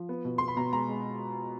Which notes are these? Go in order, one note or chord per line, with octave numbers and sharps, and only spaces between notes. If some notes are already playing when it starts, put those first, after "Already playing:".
Already playing: F3
B3
B2
B3 C6
B5
B2 A#5
G#3 A#5
G#3